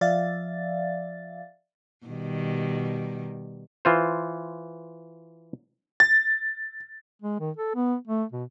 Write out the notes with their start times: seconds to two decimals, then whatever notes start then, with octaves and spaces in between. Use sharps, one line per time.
0.01 F3 D5 E5 F5 A6
2.06 B2 D#3 G3
3.85 E3 F4 C5
6.00 A6
7.22 G#3
7.40 D#3
7.57 A4
7.75 B3
8.07 A3
8.32 B2